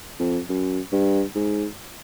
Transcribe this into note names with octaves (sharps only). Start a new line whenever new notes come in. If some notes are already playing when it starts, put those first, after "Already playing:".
F2
F#2
G2
G#2